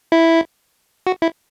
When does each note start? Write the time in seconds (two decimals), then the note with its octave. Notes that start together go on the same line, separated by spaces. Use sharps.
0.12 E4
1.07 F#4
1.22 E4